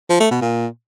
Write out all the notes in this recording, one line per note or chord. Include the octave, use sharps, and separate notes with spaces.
F3
A3
B2
A#2